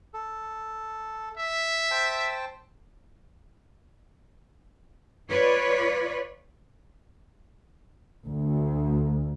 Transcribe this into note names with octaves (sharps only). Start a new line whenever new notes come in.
A4
E5
C5 G5 A5
F4 B4 C#5 D5
D2